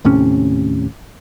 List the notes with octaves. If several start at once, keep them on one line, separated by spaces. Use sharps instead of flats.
D#2 A2 C3 C#4